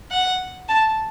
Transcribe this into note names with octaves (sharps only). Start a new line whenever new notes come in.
F#5
A5